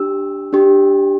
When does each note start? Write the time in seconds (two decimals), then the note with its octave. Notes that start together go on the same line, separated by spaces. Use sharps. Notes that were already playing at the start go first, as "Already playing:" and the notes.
Already playing: D4 G4 E6
0.53 D4 G4